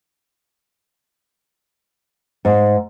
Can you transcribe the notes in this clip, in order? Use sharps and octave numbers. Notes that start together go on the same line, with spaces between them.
G#2